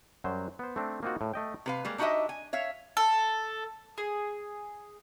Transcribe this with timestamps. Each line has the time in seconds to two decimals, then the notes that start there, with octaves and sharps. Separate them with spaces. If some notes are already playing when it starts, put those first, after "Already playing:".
0.24 F#2 F#3 G3 C5
0.59 B3 C5
0.76 A3 C4 D4
1.03 A#3 C4 D#4 F4 F#4
1.21 A2
1.34 A3 D#5 G5
1.66 C3 B4 F5
1.85 G3 G#3 A#3
1.98 D4 D#4 F#4 G4 D#5 E5
2.29 G#5
2.53 C#5 E5 F5
2.97 A4
3.98 G#4